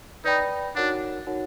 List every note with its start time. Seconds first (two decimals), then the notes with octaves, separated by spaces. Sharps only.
0.24 D#4 B4 D5 G5 B5
0.75 D4 D#4 F#4 A#4 C#5 F#5
1.26 D#4 F#4 A#4 C#5 F#5